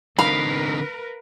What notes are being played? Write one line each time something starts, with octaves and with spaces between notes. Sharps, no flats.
D3 C4 D#4 A#4 B4 F5 B5